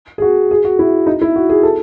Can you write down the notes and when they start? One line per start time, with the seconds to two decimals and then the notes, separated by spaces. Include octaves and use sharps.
0.18 G#4
0.22 F#4
0.51 G#4
0.65 F#4
0.79 E4
1.07 D#4
1.21 E4
1.36 F#4
1.49 G#4
1.63 A4